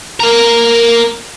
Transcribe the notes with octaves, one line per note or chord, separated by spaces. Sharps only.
A#3 A#4